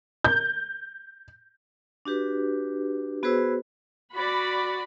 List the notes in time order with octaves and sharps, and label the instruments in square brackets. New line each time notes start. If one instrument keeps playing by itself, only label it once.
[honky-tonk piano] G6
[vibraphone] D4 F#4 G4 B4
B3 F#4 G#4 B4 C5 E6
[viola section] F#4 D5 B5